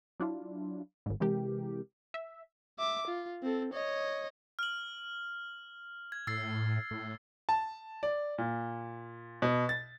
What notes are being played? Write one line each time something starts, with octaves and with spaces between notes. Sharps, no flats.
F#3 D4 E4 F4
G#1 G#2
C3 E3 G#3 G4 A#4
E5
E5 D6
F4
C4 A4
C#5 D#5
F6 F#7
G#6
A2 E6 A6 C7
A2
A5
D5
A#2
B2
A6